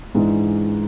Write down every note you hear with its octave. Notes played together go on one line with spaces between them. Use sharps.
G#2 E3 G#3 D4